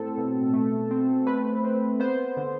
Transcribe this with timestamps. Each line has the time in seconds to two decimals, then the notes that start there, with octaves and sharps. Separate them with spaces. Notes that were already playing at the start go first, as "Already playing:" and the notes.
Already playing: A2 C4 A4
0.18 B2
0.53 A3
0.91 C4
1.27 A3 B4
1.64 C4
2.00 B3 C5
2.37 D3